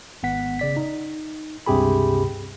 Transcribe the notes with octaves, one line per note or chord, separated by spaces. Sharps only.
G#1 B3 F#5 B6
C#3 D5 B6
D#4
C#2 G2 C3 G4 G#4 B5